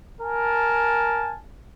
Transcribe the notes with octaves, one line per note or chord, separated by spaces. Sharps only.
A#4 G#5 A5